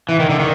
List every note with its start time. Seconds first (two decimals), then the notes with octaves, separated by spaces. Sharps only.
0.09 E3
0.19 D#3
0.30 D3
0.39 D#3